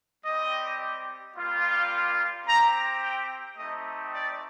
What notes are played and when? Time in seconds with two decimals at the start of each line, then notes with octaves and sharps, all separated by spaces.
0.24 G3 C4 G4 D#5
1.36 G3 A#3 F4
2.46 C4 G4 A#5
3.02 G5
3.57 A3 C4 D#4 G4 D#5
4.13 D5